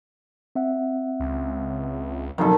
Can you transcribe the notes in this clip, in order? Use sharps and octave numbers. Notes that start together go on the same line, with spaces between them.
C4 E5 F#5
C#2
F#1 B1 F2 D#3 A4